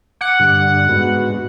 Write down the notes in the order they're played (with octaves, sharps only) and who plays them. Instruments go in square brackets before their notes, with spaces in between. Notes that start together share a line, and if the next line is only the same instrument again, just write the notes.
[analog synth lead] F#5 [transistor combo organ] D6
[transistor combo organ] G2 D3
G#2 B3 F#4